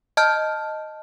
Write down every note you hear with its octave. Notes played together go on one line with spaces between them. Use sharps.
D#5 A5 F6 G6